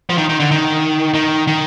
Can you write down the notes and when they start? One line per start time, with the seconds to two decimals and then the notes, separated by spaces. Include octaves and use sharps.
0.10 F3
0.18 D#3
0.29 D#3
0.39 D3
0.51 D#3
1.15 D#3
1.48 D#3